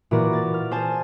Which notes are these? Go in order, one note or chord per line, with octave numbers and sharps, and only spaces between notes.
A#2 E3 F#4 B4 D5 A#5
A6
F6
G#4 C5 G#5 A5